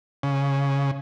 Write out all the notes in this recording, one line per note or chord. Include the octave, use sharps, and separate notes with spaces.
C#3